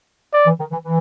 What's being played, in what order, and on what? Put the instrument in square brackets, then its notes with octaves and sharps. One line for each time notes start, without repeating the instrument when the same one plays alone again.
[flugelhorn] D5
[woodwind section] E3
D#3
E3
E3